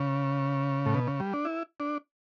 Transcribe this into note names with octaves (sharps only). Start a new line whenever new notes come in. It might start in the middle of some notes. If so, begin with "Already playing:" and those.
Already playing: C#3
A2
B2
C#3
G3
D4
E4
D4